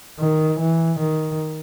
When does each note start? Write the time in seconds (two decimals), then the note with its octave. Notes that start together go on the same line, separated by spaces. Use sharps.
0.20 D#3
0.59 E3
0.99 D#3